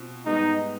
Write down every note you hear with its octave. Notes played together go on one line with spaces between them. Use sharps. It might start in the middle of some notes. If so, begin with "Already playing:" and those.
Already playing: B2 C4 F4
G#2 G3 B3 D#4